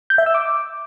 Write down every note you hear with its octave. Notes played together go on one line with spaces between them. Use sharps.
G6
E5
E6
D6